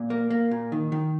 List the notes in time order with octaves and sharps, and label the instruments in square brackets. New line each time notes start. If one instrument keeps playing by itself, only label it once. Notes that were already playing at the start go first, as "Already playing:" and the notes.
Already playing: [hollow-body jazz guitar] A#2
A#3
A#3
A#2
D#3
D#3